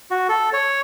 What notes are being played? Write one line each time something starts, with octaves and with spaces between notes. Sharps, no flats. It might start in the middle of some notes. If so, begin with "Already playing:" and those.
F#4
A4
C#5